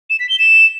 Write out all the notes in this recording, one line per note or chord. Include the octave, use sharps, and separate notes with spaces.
E7
B6
G7
E7